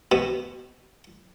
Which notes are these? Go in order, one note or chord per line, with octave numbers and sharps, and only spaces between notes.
B2